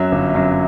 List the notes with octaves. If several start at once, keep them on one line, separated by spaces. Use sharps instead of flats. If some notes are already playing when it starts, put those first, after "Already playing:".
Already playing: F#2 F#3 E5
G1
F#2 F#3